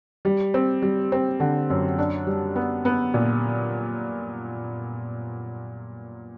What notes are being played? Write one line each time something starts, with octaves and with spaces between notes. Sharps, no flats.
G3
C4
G3
C4
D3
F#2
D4
G3
B3
B3
A#2